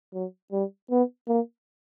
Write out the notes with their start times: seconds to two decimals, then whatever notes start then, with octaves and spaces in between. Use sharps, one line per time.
0.14 F#3
0.52 G3
0.91 B3
1.28 A#3